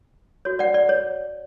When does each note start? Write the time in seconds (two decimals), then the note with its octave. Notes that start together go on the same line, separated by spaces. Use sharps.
0.45 F#4 C#5
0.59 D5 F#5
0.74 D5
0.89 C#5